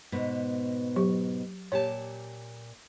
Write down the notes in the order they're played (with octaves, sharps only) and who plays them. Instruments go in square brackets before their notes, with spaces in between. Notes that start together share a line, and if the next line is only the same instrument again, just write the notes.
[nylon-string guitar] G#2 B2 B3
[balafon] F#3 G4
[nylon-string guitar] A#2 G4 A5 [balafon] C#5